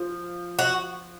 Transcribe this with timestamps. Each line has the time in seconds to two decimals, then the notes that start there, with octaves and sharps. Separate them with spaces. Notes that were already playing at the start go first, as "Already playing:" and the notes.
Already playing: F3
0.59 F#4